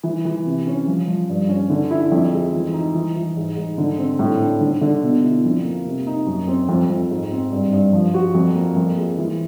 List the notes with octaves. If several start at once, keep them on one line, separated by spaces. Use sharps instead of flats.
E3
E3
C3
C#4
F3
F3
G2
C#4
D3
E4
F2
G#3
E3
D#4
E3
E3
G#2
G#2
D3
C4
A2
D4
D3
D3
B2
E4
F2
A#3
C3
D#4
F#2
C4
F2
F2
G#2
C4
G2
G2
F3
F#4
F2
A#3
F2
G#3
E3